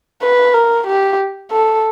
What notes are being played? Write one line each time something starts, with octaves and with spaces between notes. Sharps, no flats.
B4
A#4
G4
A4